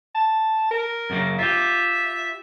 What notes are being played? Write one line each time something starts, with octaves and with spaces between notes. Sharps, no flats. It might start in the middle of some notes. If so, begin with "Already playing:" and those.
A5
A#4
F#2 C#3 A#3
F4 G4 E5